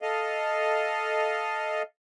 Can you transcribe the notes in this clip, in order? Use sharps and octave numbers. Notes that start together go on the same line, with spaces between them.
A4 D#5 F5